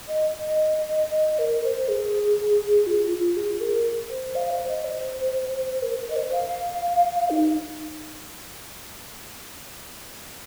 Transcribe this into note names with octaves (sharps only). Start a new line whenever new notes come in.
D#5
D#5
A#4
C5
G#4
F4
F4
G#4
A#4
C5
F5
C5
D#5
C5
A#4
A#4
D#5
C5
F5
D#4